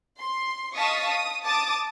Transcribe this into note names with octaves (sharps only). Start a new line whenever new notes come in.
C6
D#5 F5 A5 C#6 D#6 B6
D#6
A5 D6 D#6 A6